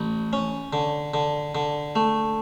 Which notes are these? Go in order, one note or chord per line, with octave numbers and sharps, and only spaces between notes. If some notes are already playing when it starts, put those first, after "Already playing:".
Already playing: A1
C#4
D3
D3
D3
A3